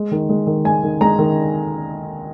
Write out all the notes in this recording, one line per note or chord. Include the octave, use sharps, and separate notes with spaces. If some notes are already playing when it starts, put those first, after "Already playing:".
Already playing: G#3
D#3
G#3
D#3
G#3 G#5
D#3
G#3 A#5
D#3